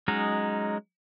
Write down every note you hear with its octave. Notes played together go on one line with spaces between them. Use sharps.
F#3 G#3 C#4 D#4